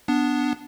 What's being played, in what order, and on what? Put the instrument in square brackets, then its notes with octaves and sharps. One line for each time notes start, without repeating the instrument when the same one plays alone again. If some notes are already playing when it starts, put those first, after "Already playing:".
[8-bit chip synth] B3 D4